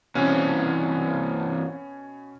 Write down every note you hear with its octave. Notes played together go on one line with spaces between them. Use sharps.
G2 B2 E3 C4 C#4